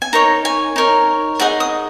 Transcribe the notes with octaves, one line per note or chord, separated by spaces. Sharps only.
G#5
D#4 A#4 C#5 A#5
G#5
D#4 A#4 C#5
D#4 G#4 D#5 F#5
D#6